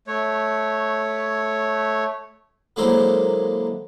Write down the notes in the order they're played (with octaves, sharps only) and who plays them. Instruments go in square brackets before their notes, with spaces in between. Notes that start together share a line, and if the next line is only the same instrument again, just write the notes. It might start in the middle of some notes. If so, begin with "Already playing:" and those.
[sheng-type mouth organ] A3 C#5
[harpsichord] D3 F#3 G#3 A#3 E4 C5